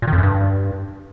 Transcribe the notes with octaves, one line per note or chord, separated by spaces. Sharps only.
A#2
D#3
F2
F#2
G2